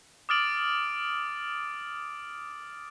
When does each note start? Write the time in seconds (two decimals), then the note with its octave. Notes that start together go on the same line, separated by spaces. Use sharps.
0.29 D6 D#6 F6 A6 D7 F#7